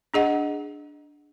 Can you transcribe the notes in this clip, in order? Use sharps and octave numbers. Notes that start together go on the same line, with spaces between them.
D4 G#4 D#5 F#5